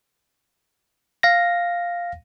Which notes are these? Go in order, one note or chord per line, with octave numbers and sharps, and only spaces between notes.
F5 A#6